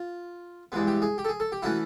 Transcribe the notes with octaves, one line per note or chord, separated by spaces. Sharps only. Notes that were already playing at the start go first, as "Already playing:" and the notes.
Already playing: F4
G2 E3 G#3 B3
G4
G#4
G4
A4
G#4
A4
G4
E3 A3 C#4 E4 F#4